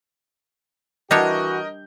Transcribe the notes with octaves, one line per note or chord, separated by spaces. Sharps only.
E3 G3 D4 F#4 A#4 C#5 D#5 G6